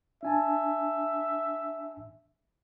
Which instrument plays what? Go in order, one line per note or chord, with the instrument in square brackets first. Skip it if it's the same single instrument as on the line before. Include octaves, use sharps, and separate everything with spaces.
[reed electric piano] D4 G#5 A5 [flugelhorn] E5